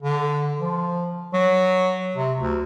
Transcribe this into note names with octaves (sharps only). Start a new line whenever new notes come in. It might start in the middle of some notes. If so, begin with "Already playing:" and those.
D3
F3
F#3
C3
D2